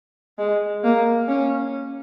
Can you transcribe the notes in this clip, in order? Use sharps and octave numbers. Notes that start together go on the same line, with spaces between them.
G#3
A#3
C#4